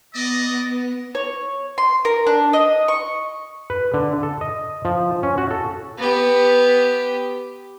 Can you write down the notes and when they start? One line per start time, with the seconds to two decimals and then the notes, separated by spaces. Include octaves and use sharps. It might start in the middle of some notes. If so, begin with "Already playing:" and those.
0.14 B3 D5 D#5
1.15 C#5
1.78 C6
2.05 A#4
2.27 D4
2.53 D#5
2.88 C#6
3.70 B4
3.94 D3
4.23 A4
4.41 D#5
4.85 F3
5.23 C#4
5.38 F#4
5.51 A4
5.98 B3 G4